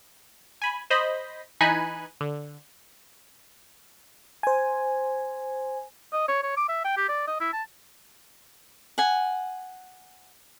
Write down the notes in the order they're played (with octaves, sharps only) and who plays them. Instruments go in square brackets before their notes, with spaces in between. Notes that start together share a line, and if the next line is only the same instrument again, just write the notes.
[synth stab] G#5 B5
C5 D#5 B5
E3 D#4 G#5 B5 F#6 G#6
D3
[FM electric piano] C5 G#5
[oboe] D#5
C#5
C#5
D6
E5
G5
G4
D5
D#5
E4
A5
[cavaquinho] F#5 G#5